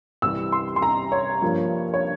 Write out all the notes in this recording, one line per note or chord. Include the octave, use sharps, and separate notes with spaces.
C2 C3 E3 G3 E6
C6
C6
A#5
C#5
G2 F3 A#3
C#5